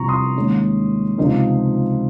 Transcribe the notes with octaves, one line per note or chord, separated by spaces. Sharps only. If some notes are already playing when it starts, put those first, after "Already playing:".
Already playing: C2 C3 F3 C4 A#5 C#6
C6 D#6
D#2 D#3 G#3 C#4
C#2 C3 F3 C4 D#4